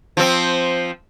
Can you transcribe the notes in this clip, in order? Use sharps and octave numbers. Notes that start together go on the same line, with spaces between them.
F3 C4